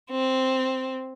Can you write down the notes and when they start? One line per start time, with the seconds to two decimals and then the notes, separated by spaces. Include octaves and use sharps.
0.11 C4